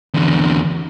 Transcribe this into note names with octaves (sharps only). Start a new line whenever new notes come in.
E2 D3